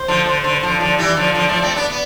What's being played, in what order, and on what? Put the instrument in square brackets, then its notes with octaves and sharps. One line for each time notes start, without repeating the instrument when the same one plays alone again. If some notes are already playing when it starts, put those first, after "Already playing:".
Already playing: [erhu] C5
[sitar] D3 F3
D3
D3
D3 F3
[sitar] D3 F3 [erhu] D5
[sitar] E3 G3
D3 F3
D3 F3
F3 A3
A3 C4
B3 D4
B3